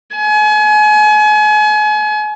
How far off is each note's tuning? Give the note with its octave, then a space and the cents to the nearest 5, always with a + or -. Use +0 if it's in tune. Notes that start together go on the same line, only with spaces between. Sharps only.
G#5 +35